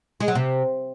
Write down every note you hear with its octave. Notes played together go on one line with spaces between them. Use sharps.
G#3
F#3
C3